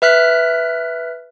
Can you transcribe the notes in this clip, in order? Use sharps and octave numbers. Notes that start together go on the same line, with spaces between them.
B4 E5 F6 F#6 B6